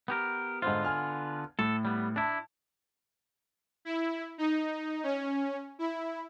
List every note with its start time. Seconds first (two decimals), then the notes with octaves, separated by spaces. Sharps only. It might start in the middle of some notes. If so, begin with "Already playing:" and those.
0.08 B3 G4 A#4
0.62 G#2 D3 B3 F4 C5
0.84 G#5 F6
1.59 A2 A4
1.85 G3 B3
2.16 D4 E4 A5
3.85 E4
4.38 D#4
5.04 C#4
5.79 E4